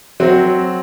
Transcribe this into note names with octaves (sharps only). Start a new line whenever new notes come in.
F#3 C4 F#4